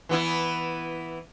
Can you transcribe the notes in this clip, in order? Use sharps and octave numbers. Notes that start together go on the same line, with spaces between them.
E3 B3 E4